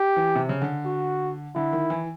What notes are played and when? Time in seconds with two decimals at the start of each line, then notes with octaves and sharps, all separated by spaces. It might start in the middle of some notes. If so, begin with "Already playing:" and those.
Already playing: G4
0.16 E3
0.35 C3
0.49 C#3
0.62 D3
0.85 F#4
1.55 D3 E4
1.73 D#3
1.90 E3